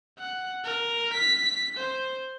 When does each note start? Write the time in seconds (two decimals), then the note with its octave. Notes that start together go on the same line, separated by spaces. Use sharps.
0.18 F#5
0.64 A#4
1.13 B6
1.77 C5